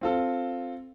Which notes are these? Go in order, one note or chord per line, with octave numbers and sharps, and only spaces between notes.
C4 F4 A4